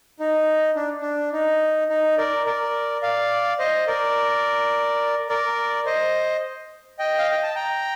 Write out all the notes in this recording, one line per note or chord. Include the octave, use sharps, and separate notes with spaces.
D#4
D4
D4
D#4
D#4
A#4 D5
A#4 D5
D5 F5
C5 D#5
A#4 D5
A#4 D5
C5 D#5
D#5 G5
F5
G5
A5
G5 A#5